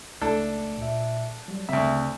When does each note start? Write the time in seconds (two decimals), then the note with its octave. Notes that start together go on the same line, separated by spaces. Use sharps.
0.21 C#2 A3 D4 A4
0.78 A#2 E5
1.48 F#3 G3
1.69 D2 C#3 C4 E5